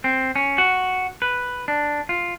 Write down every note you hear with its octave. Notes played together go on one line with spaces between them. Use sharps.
C4
C#4
F#4
B4
D4
F4